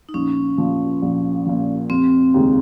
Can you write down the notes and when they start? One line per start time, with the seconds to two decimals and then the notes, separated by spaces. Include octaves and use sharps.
0.09 D#4
0.14 A#1 C#4
0.58 A#2 F3
1.02 A#1
1.46 A#2 F3
1.90 F1 C4
2.34 D#2 C#3 G#3